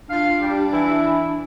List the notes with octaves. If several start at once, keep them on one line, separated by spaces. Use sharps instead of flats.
D4 F4 F5
G3 G4
E3 E4